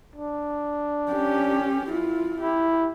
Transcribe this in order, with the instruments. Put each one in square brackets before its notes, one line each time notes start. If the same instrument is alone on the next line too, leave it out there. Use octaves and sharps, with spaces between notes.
[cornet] D4
[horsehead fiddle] C#4 G4
E4 F4
[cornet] E4 [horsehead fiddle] G4